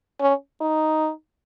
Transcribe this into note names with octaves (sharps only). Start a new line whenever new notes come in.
C#4
D#4